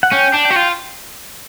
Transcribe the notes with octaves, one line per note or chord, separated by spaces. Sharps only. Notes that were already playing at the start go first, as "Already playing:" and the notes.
F#5
C#4 G5
D4
G5
F#4
F4